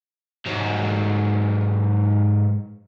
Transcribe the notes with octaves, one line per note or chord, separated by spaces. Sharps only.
G#2 F#3